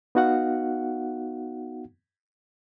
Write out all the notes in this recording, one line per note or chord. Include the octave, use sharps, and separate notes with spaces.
B3 D#4 F#4 F5 F#5